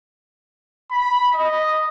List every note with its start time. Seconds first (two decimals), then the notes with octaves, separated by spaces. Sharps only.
0.92 B5
1.34 D#5